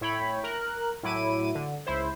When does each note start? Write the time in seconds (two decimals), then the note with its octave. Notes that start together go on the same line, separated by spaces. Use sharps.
0.01 A2 E4 C#5 G5 B5
0.44 A#4 F#6
1.03 A2 F#3 E4 D6 D#7
1.55 D3
1.87 C#2 E4 C5